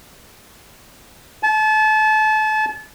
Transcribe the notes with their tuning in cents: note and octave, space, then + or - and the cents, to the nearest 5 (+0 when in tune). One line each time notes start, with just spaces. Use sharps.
A5 -30